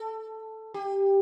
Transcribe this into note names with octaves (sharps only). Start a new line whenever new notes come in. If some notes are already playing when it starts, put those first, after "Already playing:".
Already playing: A4
G4